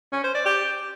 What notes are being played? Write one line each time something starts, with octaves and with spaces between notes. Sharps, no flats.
C#4
C5
D5
G4